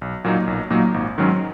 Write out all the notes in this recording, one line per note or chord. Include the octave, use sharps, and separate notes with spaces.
B1
A#2 F#3 A#3 D#4
B1
A#2 F#3 A#3 D#4
G#1
G#2 D#3 F#3 C#4